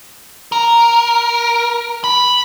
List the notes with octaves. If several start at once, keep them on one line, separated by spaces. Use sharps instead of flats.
A#4
B5